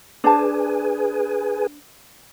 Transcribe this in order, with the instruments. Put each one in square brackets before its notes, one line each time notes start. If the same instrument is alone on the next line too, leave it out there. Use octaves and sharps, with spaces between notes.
[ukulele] D4 C5 A5 [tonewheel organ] G#4 B4 G#5